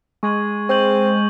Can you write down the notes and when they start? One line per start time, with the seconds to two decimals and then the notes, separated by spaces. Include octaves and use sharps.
0.23 G#3 C#6 G#6 F#7
0.69 C4 C#6 G6 F#7